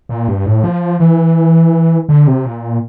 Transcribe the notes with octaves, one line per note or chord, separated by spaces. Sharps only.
A#2
G2
A2
F3
E3
D3
C3
A#2